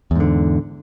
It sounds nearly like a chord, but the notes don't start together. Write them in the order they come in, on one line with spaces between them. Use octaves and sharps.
E2 G#2 D3